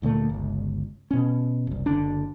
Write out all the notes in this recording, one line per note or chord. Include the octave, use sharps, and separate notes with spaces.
D1 D2 A#2 A3
G1 C#2
B2 C#4
F#1 C2
F#1 D3 D4